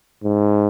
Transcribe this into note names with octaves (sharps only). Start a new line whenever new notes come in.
G#2